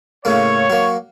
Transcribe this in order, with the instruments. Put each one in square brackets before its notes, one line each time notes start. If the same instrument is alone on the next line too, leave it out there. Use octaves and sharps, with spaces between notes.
[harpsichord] A2 C#3 A#3 [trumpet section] C#5
[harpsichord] F#3 A#3